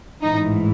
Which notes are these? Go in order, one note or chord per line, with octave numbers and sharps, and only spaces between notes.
A1 G#2 E3 D#4